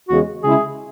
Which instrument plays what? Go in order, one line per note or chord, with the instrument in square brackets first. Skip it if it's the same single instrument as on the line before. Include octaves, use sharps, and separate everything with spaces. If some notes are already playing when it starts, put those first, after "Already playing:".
[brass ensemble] E2 C#3 G#3 [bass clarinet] F#4
[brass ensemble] C#3 G#3 E4 [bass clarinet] G#4